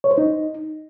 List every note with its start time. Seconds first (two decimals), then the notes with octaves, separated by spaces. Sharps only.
0.04 C#5
0.11 C5
0.18 D#4